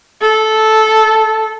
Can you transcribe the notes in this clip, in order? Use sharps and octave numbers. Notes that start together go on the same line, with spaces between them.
A4